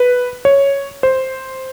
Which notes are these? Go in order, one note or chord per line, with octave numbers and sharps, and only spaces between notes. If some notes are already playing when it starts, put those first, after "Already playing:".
Already playing: B4
C#5
C5